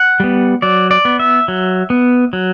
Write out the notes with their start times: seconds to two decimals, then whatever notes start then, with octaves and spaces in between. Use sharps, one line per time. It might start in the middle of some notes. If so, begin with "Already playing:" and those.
Already playing: F#5
0.20 G3 B3
0.62 F#3 D5
0.91 D5
1.05 B3
1.19 E5
1.48 F#3
1.90 B3
2.33 F#3